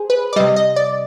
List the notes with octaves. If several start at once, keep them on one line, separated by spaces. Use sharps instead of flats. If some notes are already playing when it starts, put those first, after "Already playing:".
Already playing: G#4 C5
B4
D5
C3 G3 D#5
D#5
D5